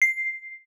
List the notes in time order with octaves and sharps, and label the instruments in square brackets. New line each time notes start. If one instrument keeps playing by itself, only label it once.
[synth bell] C7